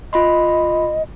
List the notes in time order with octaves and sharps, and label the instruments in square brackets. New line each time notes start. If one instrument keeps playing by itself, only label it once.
[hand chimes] F4 B5 C6 [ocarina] D#5